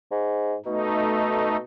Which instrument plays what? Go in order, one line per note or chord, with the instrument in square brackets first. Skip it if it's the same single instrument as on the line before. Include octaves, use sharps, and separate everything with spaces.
[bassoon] G#2
[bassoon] B2 [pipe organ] A3 D#4